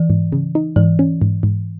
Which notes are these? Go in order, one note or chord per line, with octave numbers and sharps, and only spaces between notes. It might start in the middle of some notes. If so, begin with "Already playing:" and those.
Already playing: E3
G#2
C#3
D#4
G#2 E3
C#4
G#2
G#2